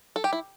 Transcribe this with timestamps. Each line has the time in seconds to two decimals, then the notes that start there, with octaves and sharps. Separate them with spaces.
0.16 A4
0.24 G4
0.33 E4